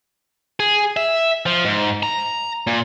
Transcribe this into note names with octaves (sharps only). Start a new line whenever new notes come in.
G#4
E5
F3
G#2
A#5
A#2